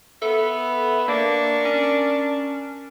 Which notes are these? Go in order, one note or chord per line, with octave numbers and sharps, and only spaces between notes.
B3 A4 E5
A#3 D4 A#4 C#6
C#4